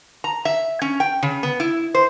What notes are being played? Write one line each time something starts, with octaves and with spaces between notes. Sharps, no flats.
A#5
E5
C#4
G5
C#3
B3
E4
C5